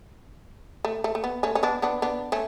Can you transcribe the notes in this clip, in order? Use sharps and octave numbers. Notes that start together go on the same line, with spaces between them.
A3
A3
A3
B3
A3 C#4
C#4
B3 D4
B3 D4
B3 D4
A3 C#4